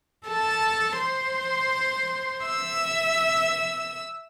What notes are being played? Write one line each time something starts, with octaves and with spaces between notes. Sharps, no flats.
A4 A5
C5 C6
E5 E6